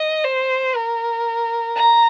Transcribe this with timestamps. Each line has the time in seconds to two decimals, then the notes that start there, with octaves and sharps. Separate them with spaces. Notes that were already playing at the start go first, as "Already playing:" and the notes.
Already playing: D#5
0.24 C5
0.75 A#4
1.76 A#5